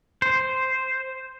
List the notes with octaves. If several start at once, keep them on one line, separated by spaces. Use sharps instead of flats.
C5